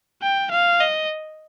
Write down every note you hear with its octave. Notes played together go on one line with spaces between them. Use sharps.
G5
F5
D#5